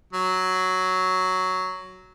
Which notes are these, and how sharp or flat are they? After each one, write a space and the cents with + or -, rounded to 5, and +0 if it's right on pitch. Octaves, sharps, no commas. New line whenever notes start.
F#3 +5